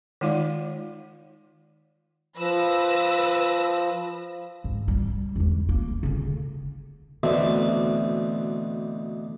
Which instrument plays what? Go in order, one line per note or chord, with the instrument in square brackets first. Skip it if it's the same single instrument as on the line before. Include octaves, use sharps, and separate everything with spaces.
[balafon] D#3 G#3 D#4 F4 D5 F5
[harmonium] F3 [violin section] B4 E6 A#6
[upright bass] G#2
G3
E2 G#3
A#3
D2 C#3
[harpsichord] D2 B2 D3 E3 C4